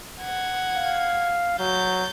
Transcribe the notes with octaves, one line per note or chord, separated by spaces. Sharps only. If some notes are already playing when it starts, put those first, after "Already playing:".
F#5 G#6
F5
F#3 G6 A6